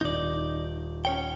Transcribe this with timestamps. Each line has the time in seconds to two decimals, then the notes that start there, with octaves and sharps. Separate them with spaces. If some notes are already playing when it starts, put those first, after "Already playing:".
0.01 D#1 D#4 D5 G6
1.05 C#4 C#5 G5